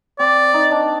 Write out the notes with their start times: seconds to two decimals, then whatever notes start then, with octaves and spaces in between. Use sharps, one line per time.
0.19 C4 D5
0.54 D#4
0.71 D4